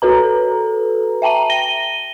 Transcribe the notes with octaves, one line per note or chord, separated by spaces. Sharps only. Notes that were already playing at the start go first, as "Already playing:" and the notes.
F#4 A4 B4 A#5
E5 G5 A5 A#5 D#7
A#6 D#7 G7